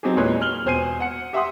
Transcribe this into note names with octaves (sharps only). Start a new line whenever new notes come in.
F#3 C4 D#4 G4 G#4
E2 A#2 G#3 B4 C#5
F6 F#7 G7
E1 B2 C5 G#5 C7 D#7
F#5 C#7
G4 E5 F#5 C6 D#6